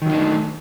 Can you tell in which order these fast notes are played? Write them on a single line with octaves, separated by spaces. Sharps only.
D#3 F#3 D#4 D4 A3